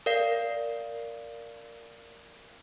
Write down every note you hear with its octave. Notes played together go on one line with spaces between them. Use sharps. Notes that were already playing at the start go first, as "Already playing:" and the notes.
A#4 D5 F5 C7